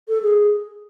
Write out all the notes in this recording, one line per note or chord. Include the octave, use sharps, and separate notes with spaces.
A4
G#4